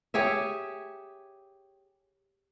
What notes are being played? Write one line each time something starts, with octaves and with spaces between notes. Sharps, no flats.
G4 G#4 C#5 E5